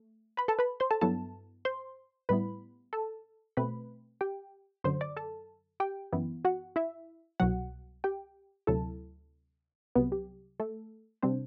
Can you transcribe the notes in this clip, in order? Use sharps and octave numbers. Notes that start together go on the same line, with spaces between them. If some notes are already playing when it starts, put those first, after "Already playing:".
Already playing: A3
B4 B5
A4 A5
B4 B5
C5 C6
A4 A5
G2 F#3 B3 E4 A4 A5
C5 C6
A2 G3 B3 E4 B4 B5
A4 A5
B2 A3 C4 B4 B5
G4 G5
F#2 D3 F#3 C5 C6
D5 D6
A4 A5
G4 G5
F#2 E3 B3 E4
F#4 F#5
E4 E5
C2 B2 F#3 F#4 F#5
G4 G5
D2 C3 F#3 C4 E4 A4 A5
C2 C3 F#3 B3 B4
G4
A3 A4
C3 G3 C4 D4 C5